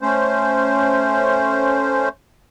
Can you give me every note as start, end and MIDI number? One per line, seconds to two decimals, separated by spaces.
0.01 2.09 57
0.01 2.09 61
0.01 2.09 72